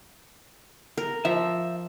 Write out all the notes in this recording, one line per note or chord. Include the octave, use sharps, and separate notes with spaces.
A#4
F3 E5